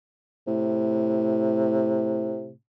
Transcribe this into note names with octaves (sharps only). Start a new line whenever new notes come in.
A2 C3